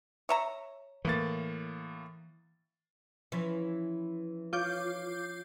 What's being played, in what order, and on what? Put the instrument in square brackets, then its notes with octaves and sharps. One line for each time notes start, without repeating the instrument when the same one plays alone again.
[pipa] C#5 E5 A#5
[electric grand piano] A2 A#3 A6 [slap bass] E3
[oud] E3 [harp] F3 C#4 E4
[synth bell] F4 D6 G6 [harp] C#5